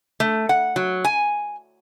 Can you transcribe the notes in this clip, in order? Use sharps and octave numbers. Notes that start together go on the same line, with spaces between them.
A3
F#5
F#3
G#5